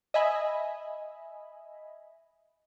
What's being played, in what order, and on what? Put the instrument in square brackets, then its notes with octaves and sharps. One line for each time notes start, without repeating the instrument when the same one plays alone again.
[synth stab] D#5 E5 G#5 B5